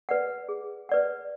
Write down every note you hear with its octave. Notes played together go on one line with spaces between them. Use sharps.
B4 D5 F#5
G#4
B4 D5 F#5